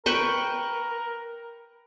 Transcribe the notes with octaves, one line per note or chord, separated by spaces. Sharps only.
A#4 B4 G5 C#6